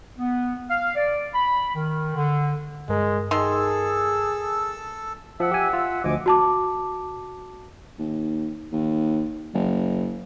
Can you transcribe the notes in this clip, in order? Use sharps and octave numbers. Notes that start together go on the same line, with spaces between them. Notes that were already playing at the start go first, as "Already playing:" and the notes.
B3
F5
D5
B5
D#3
D3
G2 G#3 A#4
D#3 G#4 A4 A5 C6 E6
F3 E5 F#5 E6
G4 G#5
F4
D2 F3 D#5 G#5 D6
F#4 A5 D6
D#2
D#2
F#1